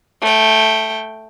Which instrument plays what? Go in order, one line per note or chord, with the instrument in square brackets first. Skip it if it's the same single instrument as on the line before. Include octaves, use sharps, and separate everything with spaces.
[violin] A3 G5